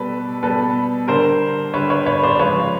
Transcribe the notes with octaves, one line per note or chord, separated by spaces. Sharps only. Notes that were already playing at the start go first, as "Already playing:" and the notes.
Already playing: B2 G3 A4 B4
B2 G3 A4 B4
D3 G3 A#4 C5
D3 G3 B4 C#5
B4 C#5
B4 C#5
C5 D5
C#3 F3 G#3 B4 C#5